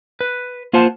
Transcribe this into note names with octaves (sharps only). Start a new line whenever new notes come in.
B4
A#3 F4 C5 F#5 A5